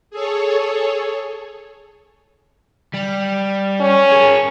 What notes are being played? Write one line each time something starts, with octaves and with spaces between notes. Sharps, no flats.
G#4 A4 C#5
G3
C#4
G#4 A#4